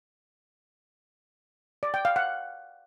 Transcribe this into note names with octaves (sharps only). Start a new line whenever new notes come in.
D5
G5
F5
F#5